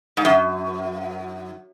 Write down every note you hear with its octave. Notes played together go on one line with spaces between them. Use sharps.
G#2
F#2